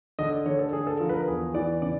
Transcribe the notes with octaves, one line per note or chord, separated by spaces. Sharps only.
D3 D#5
D5
D3 C#5
A4
D3 G#4
A4
F3 A#4
B4
A#4
E2 G#4
E3 D5
C#3 D5